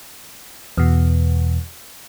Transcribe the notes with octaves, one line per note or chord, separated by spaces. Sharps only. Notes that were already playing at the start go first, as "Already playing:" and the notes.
E2 B2